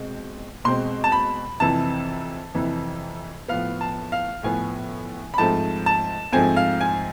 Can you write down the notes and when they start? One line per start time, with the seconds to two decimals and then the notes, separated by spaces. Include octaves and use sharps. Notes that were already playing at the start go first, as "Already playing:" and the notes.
Already playing: B2 G#3 C4
0.65 B2 G#3 C4 C6
1.04 A5
1.12 B5
1.60 F2 C3 E3 A5
2.55 F2 C3 E3
3.48 A2 F3 B3 F5
3.81 A5
4.12 F5
4.43 A2 F3 B3 G#5
5.34 B5
5.38 G#2 F3 A3 C4 A5
5.86 A5
6.33 G#2 F3 A3 C4 G#5
6.57 F5
6.81 G#5